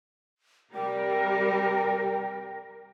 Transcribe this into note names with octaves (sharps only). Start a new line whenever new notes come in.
C3 G3 A#4 G5